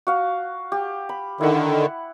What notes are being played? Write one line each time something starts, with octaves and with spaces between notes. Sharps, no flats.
F#4 F5
G4
B5
D3 D#3 E4 F#5